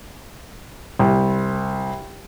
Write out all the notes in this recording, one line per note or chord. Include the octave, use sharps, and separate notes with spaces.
C2